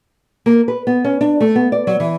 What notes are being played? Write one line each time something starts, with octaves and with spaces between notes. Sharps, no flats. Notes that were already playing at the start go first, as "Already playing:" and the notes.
A#3
B4
B3
C#4
D4
A3
B3
D5
F#3
E3